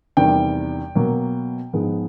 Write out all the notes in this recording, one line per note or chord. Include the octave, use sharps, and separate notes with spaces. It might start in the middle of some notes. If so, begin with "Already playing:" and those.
E2 C3 D#3 G3 G5
B2 F#3 A#3
G#2 F3 G#3 B3